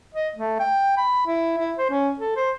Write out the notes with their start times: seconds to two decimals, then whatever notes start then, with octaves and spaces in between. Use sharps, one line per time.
0.15 D#5
0.35 A3
0.60 G5
0.97 B5
1.27 E4
1.58 E4
1.78 C5
1.90 C#4
2.19 A4
2.36 C5